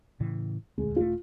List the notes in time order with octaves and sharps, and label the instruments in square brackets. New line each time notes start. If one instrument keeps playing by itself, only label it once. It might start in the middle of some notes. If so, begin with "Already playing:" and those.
[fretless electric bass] A2 C#3 E3
[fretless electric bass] D#1 D2 [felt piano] G#3
[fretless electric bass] D#1 A3 [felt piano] F4